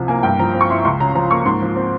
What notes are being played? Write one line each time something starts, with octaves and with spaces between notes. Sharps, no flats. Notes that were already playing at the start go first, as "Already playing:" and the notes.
Already playing: C2 C3 F3
A#3 G#5
G2 G5
F3 A#5
C4
C#6
E4 C6
C#2 C6
C#3 A#5
F3 A#5
A#3 C#6
G#2 C6
F3
C4